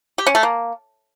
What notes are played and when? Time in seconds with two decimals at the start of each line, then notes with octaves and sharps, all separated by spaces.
0.18 G4
0.26 C#4
0.35 A3
0.43 A#3